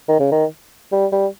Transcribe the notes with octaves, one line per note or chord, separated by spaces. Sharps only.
D#3
C#3
D#3
G3
G3